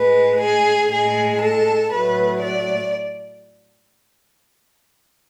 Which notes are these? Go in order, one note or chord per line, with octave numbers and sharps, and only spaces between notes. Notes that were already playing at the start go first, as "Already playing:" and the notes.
Already playing: A2 G#3 B4
G#4
A2 G#3 G#4
A4
A2 F#3 A3 B4
D5